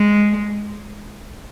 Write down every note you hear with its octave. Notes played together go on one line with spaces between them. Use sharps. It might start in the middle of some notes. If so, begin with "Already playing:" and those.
Already playing: G#3